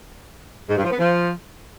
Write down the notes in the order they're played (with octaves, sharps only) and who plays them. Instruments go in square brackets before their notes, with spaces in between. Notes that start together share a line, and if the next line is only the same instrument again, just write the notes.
[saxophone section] G#2
G2
F3
B3
F3